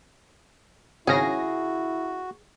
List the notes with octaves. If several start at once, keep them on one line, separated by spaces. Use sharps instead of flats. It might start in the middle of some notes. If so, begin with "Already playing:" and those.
G#1 C#3 E4 F#4 G#4 A#6